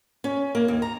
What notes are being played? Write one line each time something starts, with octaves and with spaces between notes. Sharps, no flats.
C#4
A#3
D#2
A#5